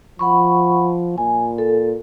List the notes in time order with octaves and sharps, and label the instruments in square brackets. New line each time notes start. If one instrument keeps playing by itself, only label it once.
[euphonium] F3 [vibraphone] F#5 B5 C#6
[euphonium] A#2 [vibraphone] G#5
[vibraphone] A4